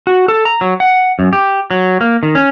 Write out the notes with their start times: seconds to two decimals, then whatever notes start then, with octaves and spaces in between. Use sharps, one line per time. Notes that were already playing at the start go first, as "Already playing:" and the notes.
0.07 F#4
0.28 A4
0.45 A#5
0.61 F#3
0.80 F#5
1.19 F#2
1.33 G4
1.71 F#3
2.01 A#3
2.23 D#3
2.35 C#4